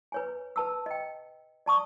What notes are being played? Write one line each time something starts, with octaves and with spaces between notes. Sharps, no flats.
B4 C#5 G#5
B4 A5 E6
D#5 G5
D5 A5 C#6 D#6